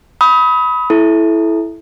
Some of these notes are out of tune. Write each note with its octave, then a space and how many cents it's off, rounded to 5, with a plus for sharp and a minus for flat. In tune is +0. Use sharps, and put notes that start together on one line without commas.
B5 +0 D#6 +35
E4 +0 A4 -25